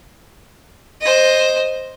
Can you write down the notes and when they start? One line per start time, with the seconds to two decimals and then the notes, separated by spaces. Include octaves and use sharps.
1.01 C5 D#5